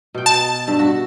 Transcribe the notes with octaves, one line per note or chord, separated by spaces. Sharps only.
B2 G5
A5
G2
F#4